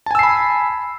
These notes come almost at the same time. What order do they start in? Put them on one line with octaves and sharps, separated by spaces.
A5 G#5 E6 C7 B5